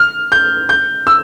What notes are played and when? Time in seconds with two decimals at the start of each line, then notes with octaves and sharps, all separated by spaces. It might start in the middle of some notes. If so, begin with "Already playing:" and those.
Already playing: F6
0.32 G6
0.69 G6
1.07 E6